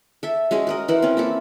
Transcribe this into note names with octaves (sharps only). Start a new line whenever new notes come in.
A4 E5
G#3 C#4 F#4 G#4
F#4 A#4 D#5
E3 A#4 C5 F#5
C4 C#4
A#3 E4 A4